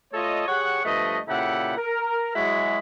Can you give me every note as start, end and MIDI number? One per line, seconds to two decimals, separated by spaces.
0.13 0.46 57
0.13 0.46 65
0.13 0.46 69
0.13 0.46 73
0.13 0.46 75
0.48 0.81 67
0.48 0.81 68
0.48 0.81 73
0.48 0.81 78
0.84 1.18 43
0.84 1.18 53
0.84 1.18 57
0.84 1.18 71
0.84 1.18 75
1.28 1.77 46
1.28 1.77 49
1.28 1.77 64
1.28 1.77 67
1.28 1.77 69
1.28 1.77 78
1.77 2.31 70
2.35 2.78 54
2.35 2.78 56
2.35 2.78 64
2.35 2.78 66
2.35 2.78 68
2.35 2.78 73